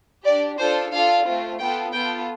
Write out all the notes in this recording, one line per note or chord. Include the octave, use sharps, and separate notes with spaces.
D4 G4 D5
D4 F4 A4 C5
D4 F4 A4 F5
A3 C4 F4
B3 F4 A4 G5
B3 F4 A4 G5